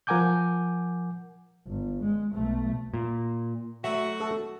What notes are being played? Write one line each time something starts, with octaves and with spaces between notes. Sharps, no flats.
F3 A#4 F#5 G#5 D6 G6
G1
G#3
B1 A3
A#2
F#3 A3 F#4 E5
A4